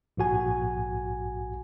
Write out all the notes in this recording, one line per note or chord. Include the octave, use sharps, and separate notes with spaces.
A#1 G#2 F#4 G#5